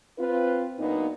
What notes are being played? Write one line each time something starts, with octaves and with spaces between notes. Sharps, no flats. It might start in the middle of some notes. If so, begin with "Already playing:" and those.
C4 F4 B4
A#2 F#3 A#3 B3 D4 D#4